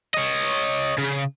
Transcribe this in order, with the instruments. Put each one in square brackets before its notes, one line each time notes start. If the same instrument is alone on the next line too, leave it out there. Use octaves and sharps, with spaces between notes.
[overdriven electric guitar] C#5 D#5
C#3